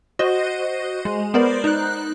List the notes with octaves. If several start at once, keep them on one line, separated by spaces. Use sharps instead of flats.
F#4 C5 D#5
G#3
B3 A#4 C5 D5
D#4 F#6